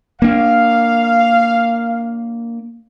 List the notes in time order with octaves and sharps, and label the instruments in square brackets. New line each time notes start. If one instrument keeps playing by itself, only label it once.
[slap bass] A#3 D4 [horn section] F5